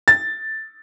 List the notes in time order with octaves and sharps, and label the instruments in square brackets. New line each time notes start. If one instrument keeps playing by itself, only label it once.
[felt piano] A6